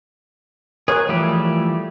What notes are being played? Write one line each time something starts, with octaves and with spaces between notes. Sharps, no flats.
G#4 A#4 C#5 F#5
E3 F3 G3 A3 G4